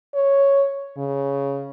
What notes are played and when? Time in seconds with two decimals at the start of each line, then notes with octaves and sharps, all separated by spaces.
0.14 C#5
0.97 C#3